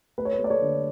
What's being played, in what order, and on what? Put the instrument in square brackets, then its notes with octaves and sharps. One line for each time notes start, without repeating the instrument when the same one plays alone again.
[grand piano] A3 B4
C#5
B4
A3
D5
A4 C#5
D3